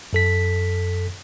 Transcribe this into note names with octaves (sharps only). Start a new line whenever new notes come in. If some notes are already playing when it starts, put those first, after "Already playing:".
F#2 A4 B6